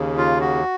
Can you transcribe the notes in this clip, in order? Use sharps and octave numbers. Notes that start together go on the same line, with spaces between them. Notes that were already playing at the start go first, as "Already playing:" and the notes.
Already playing: D#2 C#3
F4
F#4